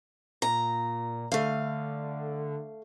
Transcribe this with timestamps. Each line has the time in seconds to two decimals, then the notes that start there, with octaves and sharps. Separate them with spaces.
0.42 A#2 A#5
1.32 D3 A3 F5